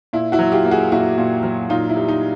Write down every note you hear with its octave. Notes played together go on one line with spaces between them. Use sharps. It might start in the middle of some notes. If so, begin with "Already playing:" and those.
A#2 E4
E4 F#4
F#3
F4 G4
A#3
F#4 G#4
A#2 E4 F#4
A#2
F#3
A#2 D#4 F4
E4
G3
D#4